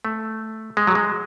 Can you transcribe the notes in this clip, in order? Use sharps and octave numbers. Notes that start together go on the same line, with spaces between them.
A3
G#3
F#3
G#3